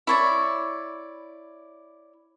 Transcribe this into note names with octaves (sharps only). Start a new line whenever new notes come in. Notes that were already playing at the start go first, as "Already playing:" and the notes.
E4 C#5 D5